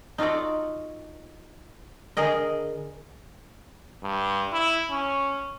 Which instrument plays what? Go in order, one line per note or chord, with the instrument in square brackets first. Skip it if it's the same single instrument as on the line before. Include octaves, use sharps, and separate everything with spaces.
[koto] D#4 F4 F#4 A4 D5
D3 G#4 A#4 D#5
[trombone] G2
E4
C#4